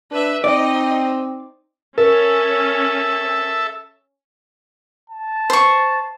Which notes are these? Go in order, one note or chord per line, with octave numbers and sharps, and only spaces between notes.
D4 B4 E5
C4 D#4 D5 D#5
C#4 A4 A#4 E5
A5
C5 C#6